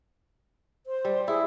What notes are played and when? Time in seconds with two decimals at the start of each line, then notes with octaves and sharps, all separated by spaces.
0.87 C5
1.05 G3
1.28 E4 G#4